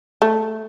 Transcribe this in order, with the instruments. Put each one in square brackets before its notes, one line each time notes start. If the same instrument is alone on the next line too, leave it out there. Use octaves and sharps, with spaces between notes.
[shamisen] A3